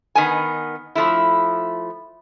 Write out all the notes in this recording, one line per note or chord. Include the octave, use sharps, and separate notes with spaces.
D#3 B3 G#5
F3 A3 E4